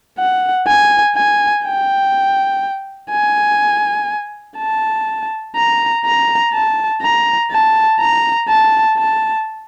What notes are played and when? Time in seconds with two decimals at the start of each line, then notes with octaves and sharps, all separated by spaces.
0.18 F#5
0.67 G#5
1.16 G#5
1.65 G5
3.11 G#5
4.58 A5
5.56 A#5
6.05 A#5
6.53 A5
7.02 A#5
7.51 A5
8.00 A#5
8.49 A5
8.98 A5